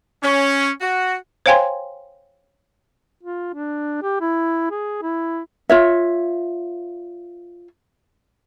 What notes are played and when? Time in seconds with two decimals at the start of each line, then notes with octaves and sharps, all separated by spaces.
0.22 C#4
0.81 F#4
1.46 C5 C#5 F5 G5 G#5 C6
3.23 F4
3.54 D4
4.02 G4
4.21 E4
4.71 G#4
5.02 E4
5.69 F4 C#5 E5